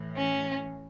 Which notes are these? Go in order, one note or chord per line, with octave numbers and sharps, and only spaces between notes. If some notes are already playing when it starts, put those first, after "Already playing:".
Already playing: A2 E3
C#4